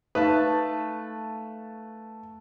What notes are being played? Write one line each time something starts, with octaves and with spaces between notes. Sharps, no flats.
A3 D#4 B4 F5 A5